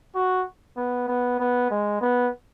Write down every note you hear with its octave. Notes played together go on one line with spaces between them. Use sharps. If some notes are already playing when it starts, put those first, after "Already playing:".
F#4
B3
B3
B3
G#3
B3